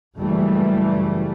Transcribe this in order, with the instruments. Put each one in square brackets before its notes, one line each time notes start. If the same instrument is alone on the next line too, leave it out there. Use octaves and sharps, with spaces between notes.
[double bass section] F#1 E3 G3 A3